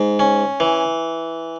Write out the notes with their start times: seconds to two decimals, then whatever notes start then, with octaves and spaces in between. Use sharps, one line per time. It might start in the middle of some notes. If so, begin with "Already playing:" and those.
Already playing: G#2
0.19 C#4
0.60 E3